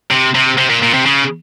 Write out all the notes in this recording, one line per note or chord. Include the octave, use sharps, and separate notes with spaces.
C3
C3
C3
A#2
A#2
C3
C#3